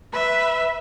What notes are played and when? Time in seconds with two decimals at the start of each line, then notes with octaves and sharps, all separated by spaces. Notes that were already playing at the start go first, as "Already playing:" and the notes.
0.13 B4 E5